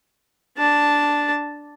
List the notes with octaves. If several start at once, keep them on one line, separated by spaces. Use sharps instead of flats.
D4 A5